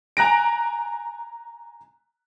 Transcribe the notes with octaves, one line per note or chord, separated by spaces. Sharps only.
G#5 A#5 F#6 A#6 D7